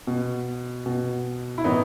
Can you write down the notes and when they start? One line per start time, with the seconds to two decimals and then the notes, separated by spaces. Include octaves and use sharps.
0.07 B2
0.86 B2
1.58 E4
1.64 A2 E3 B3 D#4